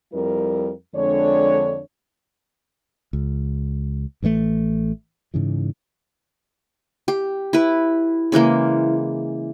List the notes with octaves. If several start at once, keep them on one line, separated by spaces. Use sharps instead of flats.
F2 G3 E4 A#4
F2 D3 G#3 D4 C#5
C#2
A1 E3 G#3 A3
G#2 C#3 E3
G4
E4 B4
C#3 E3 G#3 A#3